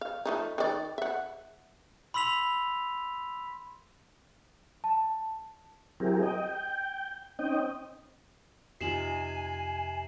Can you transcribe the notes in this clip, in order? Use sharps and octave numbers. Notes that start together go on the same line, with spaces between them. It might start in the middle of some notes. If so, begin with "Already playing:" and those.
F5
F3 A3 D#4
D#3 D5
E5 F#5
B5 C6 E6 B6 F7
A5
F#3 C4 E4 G4 G#4 A#4
D#5 G5
G5
C4 C#4 D#4 D#5 G5
F2 C3 D#4 F4 G#5 C7 E7 F#7